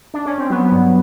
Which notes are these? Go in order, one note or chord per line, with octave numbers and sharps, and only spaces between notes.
D4
C#4
C4
F#3 B3
G2